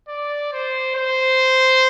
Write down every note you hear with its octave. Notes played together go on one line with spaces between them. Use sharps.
D5
C5
C5